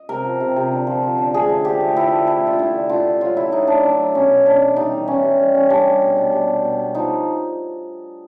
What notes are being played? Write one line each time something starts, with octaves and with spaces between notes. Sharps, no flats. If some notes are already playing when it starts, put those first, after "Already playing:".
Already playing: D#5
C3 A#4
F3
C3
C3
D3
F3
F3
D3
A3 G#4
D3
F3 G4
A3
D3 E4
A3
A3 E4
D3 F4
D3 E4
D3
D3 F4
D3
F#3 F4
F#3 E4
F#3 D#4
A3 D4
F#3 D4
F#3
B2 C#4
B2
E3 D4
E3
G3 D#4
E3
E3 C#4
G3
G3
C#4
G3 D4
G3
B2
B2
G3
B2
B2
B3
F3 D#4